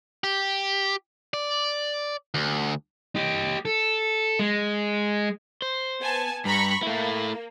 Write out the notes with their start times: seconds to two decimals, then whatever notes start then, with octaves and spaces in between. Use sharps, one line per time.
0.24 G4
1.34 D5
2.34 D2
3.16 G4 D#5
3.65 A4
4.39 G#3
5.62 C5
6.01 B3 G#5 A5
6.45 G2 A#5 B5 C#6
6.83 A3 A#3 E4